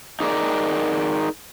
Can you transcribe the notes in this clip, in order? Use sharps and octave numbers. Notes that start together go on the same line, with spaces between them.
D#4 G#4 A#4 D5